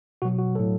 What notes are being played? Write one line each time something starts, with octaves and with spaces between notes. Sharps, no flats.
B2 F#3 F#4
F#4
A2 F#3 A4